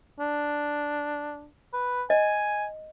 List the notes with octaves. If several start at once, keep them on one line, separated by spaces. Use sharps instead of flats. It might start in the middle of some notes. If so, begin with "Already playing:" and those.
D4
B4
D#5 G#5